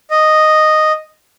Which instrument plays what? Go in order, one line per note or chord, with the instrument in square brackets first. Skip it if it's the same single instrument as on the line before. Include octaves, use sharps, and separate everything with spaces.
[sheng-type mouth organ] D#5